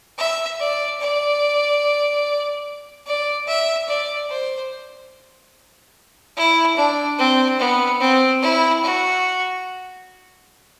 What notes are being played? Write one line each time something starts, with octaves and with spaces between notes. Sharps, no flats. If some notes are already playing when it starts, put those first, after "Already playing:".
E5
D5
D5
D5
E5
D5
C5
E4
D4
C4
B3
C4
E4
F#4